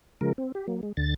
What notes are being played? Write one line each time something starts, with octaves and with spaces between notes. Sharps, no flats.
C#3 F3 G#3 A#4
C4
G4
F#3 A#3
G#3
D2 D3 A6